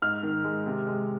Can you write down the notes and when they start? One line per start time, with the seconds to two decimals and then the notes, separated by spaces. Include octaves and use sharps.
0.02 G#2 F6
0.23 D#3
0.44 G#3
0.66 C3
0.87 G#3